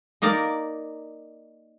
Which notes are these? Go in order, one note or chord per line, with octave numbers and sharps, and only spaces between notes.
A#3 D#4 A#4 D5